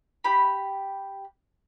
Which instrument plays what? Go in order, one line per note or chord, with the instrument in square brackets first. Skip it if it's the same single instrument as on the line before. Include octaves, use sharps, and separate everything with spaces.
[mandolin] G4 B5